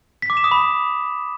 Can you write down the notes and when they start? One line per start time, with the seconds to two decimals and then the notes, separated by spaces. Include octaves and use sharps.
0.22 B6
0.30 D6
0.37 E7
0.44 D#6
0.51 B5